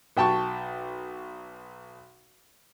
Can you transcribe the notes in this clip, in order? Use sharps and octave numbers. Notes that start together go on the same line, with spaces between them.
B1 G5 A5 C#6